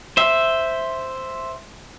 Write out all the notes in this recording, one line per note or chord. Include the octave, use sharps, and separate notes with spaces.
C5 E5